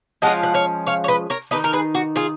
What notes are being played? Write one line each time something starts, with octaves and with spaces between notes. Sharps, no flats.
F3 G#3 C#4 F4 D#5 F#5
F#5
C#5 F5
C#5 F5
C#5
B4 D#5
A#4 C#5
D#3 A#3 D#4 B4 D#5
A#4
G#4 B4
F#4
F4 G#4